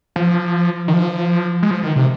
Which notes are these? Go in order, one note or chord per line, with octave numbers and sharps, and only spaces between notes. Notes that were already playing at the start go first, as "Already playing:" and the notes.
F3
D#3
F3
G#3
F3
D#3
C3